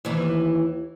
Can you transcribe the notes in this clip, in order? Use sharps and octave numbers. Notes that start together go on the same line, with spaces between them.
D#2 E3